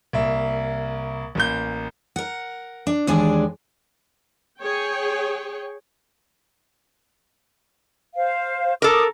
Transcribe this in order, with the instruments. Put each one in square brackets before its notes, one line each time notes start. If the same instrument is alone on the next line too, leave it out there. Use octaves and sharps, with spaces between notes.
[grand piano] C2 A#3 E5
A1 A#3 G6
[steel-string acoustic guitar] A#4 F#5
D4
D#2 E3 G#3 D4 G#4 D5
[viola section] G#4 C#5 G5
[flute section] C5 F5
[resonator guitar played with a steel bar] A4 A#4 [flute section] D6 D#6